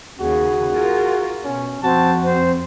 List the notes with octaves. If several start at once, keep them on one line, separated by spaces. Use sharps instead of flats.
D#2 C#3 F#4 G#4
F4 A#4
B2 C#4
F2 C4 F#4 A5
C4 C5